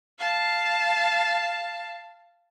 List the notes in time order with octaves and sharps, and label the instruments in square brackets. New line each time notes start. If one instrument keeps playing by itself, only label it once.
[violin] F5 A5